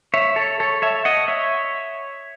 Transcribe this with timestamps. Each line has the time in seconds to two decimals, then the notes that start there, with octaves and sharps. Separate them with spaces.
0.14 C#5 E5
0.36 A4 C#5
0.60 A4 C#5
0.82 C#5 E5
1.05 D#5 F#5
1.28 C#5 E5